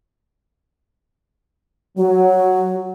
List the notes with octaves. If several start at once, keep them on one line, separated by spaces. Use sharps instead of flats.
F#3 F#4